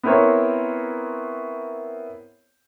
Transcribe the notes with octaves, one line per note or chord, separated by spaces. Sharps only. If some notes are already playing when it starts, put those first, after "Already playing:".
B3 C4 E4 A#4 C5 C#5